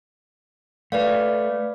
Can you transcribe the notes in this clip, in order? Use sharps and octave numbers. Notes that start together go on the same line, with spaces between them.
A3 B4 D5 F5